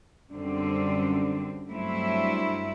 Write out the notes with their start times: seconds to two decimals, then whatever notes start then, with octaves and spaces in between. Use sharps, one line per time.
0.33 F#2 D3 G3 C4
1.69 G2 F#3 A3 C4 E4